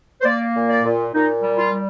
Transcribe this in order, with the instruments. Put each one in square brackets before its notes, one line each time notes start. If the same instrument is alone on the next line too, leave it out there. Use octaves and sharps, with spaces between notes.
[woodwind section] C5
A#3 D5
A#2
D5
A#2
A#2 D#4
G3
F4
G3